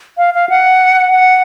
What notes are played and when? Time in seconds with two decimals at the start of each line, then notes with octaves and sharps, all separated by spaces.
0.18 F5
0.34 F5
0.49 F#5
1.12 F#5